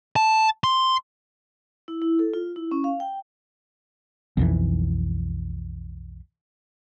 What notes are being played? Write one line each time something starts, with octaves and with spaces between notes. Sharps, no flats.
A5
C6
E4
E4
A4
F4
E4
C#4
F5
G5
B1 F2 E3